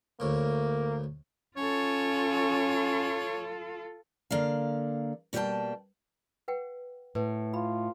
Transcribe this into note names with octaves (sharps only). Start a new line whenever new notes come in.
D2 A2 A#3
C#4 F4 A4 C#5
D3 A#3 D5 F5
B2 G3 A#3 A#4 G5 A5
B4 F#5 G5
A2 B4
F4 B5